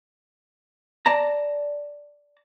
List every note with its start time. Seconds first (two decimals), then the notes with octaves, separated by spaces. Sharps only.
1.06 D5 A5 A#5